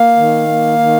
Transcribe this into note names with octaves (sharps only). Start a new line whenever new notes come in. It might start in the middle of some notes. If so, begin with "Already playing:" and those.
Already playing: A#3 F5
D#3
A#3
D#3